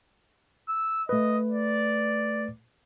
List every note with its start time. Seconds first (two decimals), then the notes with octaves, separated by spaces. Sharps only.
0.69 E6
1.09 A3 B4 D#5
1.51 D5